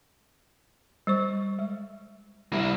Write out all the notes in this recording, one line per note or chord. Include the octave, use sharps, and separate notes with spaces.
G3 C5 C#6
G#3
G3 E4